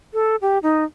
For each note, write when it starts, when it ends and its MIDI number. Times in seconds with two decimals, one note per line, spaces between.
0.14 0.36 69
0.42 0.58 67
0.63 0.84 63